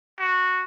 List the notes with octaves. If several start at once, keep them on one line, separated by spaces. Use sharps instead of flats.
F#4